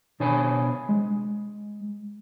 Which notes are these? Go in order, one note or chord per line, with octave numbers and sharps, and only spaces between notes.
B2 D4 C5 C#5 G#5 B5
G#3